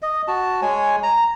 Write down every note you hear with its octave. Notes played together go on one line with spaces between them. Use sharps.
D#5
F#4 A5
G#3 C#5 G#5
A#5